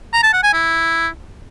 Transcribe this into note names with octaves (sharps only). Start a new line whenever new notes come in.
A#5
A5
F#5
G#5
E4